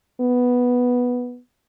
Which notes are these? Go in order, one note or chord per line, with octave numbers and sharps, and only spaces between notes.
B3